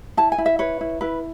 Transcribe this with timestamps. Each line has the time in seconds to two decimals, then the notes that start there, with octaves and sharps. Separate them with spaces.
0.17 E4 A5
0.32 G#5
0.38 E4
0.46 E5
0.59 B4 C#5
0.81 E4
1.01 E4 B4